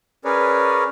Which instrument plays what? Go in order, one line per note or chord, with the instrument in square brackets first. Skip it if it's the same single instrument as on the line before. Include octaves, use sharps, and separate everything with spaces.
[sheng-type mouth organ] C#4 G#4 A#4 B4 C#5 D5